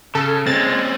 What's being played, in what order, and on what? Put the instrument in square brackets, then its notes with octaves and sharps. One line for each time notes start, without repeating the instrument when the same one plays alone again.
[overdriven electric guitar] C#3 [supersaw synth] A4
[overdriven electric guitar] G#3 [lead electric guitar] C4 C#4 [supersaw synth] A6